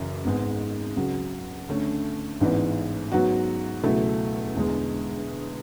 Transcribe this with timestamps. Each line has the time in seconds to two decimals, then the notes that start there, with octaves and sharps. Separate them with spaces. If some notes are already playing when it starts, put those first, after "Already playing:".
Already playing: F#1 F#2 C#3 E3
0.25 G#1 G#2 G#3 B3
0.97 C#2 C#3 F#3
1.68 D2 D3 A3 C#4
2.40 A1 G#2 E3 B3 D4
3.12 G#2 F#3 B3 F#4
3.83 C#2 B2 F#3 A3 E4
4.55 E1 E2 D3 G#3